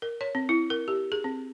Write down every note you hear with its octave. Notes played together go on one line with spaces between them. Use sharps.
A#4
C#5
C4
E4
A#4
G4
G#4
C4